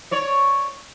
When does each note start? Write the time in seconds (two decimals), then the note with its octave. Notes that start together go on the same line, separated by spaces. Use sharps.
0.11 C#5 D5